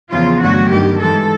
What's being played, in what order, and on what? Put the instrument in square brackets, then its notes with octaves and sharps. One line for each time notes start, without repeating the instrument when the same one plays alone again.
[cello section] E2 C#3 F3 F4
G2 D3 F#3 A3 F#4
G2 D#3 G3 G4
G#2 E3 G#3 A4